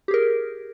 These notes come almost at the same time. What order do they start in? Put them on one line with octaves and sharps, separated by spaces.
G4 G#4 A#4